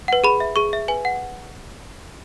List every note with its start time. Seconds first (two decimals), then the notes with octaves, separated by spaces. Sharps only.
0.08 B4 F#5
0.24 G#4 B5
0.40 E5
0.56 G#4 C#6
0.73 E5
0.88 B4 G#5
1.05 F#5